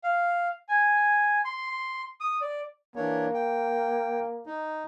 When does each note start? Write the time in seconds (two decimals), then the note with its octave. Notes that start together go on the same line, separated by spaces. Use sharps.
0.04 F5
0.69 G#5
1.45 C6
2.20 D#6
2.41 D5
2.96 E3 A#3 D4 C#5
3.34 G5
4.46 D#4